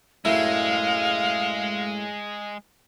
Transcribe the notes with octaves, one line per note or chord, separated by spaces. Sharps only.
F#2 A2 G#3 E4 F5